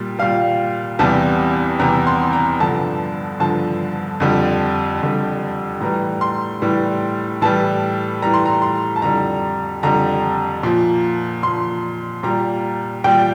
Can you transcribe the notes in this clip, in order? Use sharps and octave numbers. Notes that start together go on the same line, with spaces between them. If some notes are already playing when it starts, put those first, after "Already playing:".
Already playing: A#2 G3
A#2 G3 F5
E2 C3 G3 A5
E2 C3 G3 A#5
C6
A#5
G2 D3 F3 A5
G2 D3 F3 A5
F2 D3 G3
F2 D3 G3
A2 E3 G3 A#5
C6
A2 E3 G3
A2 E3 G3 A5
A2 E3 G3 A#5
C6
A#5
C6
A5
F2 D3 G3 A#5
F2 D3 G3 A#5
A#2 F3
A#2 F3 C6
A#2 G3 A#5
A#2 G3 G5